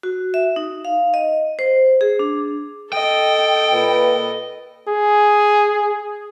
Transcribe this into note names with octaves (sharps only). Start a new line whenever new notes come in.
F#4
E5
D#4
F5
D#5
C5
G#4
D4
A4 D#5 G5
A#2 B4
G#4